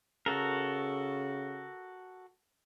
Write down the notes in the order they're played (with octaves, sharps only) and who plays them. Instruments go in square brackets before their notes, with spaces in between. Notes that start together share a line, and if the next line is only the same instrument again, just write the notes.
[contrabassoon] C#3 [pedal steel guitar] F#4 A4 A#4